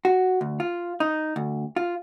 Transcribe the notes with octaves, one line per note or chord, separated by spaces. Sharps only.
F#4
D2
F4
D#4
D2
F4